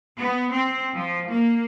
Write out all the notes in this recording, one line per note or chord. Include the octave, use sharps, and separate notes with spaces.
B3
C4
F3
A#3